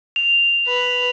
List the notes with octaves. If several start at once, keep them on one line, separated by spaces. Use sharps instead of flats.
F7
B4